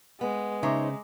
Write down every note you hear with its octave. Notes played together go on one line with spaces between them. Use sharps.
G#3 B3
C#3 D#4 C5 C#5 E5 A#5 D6